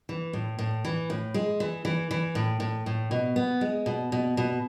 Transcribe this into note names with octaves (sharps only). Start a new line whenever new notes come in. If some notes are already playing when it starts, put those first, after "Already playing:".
E3
A2
A2
E3
A2
G#3
E3
E3
E3
A2
A2
A2
B2
B3
G#3
B2
B2
B2